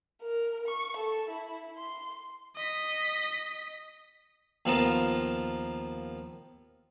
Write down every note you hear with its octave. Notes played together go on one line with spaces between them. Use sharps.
A#4
C#6
A4
E4
C6
D#5 B6
D#2 F3 B3 F4 A#4 A5